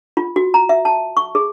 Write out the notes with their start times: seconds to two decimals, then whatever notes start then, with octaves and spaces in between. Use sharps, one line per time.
0.17 F4
0.36 F#4
0.54 A#5
0.69 E5
0.85 A5
1.17 C#6
1.35 G#4